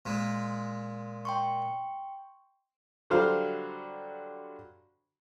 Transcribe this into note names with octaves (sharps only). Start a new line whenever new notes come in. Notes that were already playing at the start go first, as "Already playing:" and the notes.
A#2 G#3
G5 C6 C#6
D3 F#3 G3 C5 F5